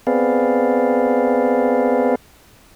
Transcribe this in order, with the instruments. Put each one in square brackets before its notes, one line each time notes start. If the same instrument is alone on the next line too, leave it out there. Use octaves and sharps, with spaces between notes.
[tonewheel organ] B3 C4 G#4 B4 D5 F5